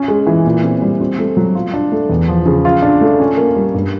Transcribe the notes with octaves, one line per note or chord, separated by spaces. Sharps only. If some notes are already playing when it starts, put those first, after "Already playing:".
Already playing: C#4
G#3
E3
A#2
C4
G3
C4
A3
F#3
F4
D4
A3
E2
F3
C#3
F4
D4
A3
C#4
A#3
G3
G2